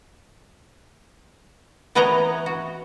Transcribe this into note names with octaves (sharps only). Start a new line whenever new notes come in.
E3 B3 B4 C#5 D#5 A#5
F#4